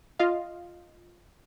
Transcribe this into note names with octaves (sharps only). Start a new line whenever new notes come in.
F4 D#5 F5